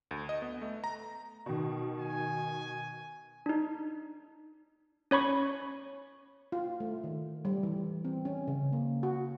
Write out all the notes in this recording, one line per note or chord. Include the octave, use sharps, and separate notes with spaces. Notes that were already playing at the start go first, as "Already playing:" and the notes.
D2
D#5
B3
A3
A#5
B2 D#3
G#5
D4 D#4
C#4 C#5 B5 C#6
F4
A3
D#3
G3
E3
C4
C#4
C#3
A#3
F#4